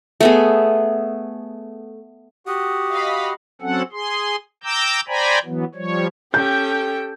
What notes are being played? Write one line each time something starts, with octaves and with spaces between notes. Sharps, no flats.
A3 B3 G#4
F#4 G4 F#5 D#6
D#5 F5 B5
F#3 C4 C#4 A4 F#5
G#4 C6
G5 A#5 D6 E6 G6
C5 D5 G5 G#5 A#5 B5
E3 F#3 B3
F3 G3 C#5
C#4 G4 A4 G5 G6